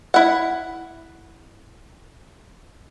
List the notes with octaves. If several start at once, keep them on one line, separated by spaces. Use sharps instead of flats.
E4 F#5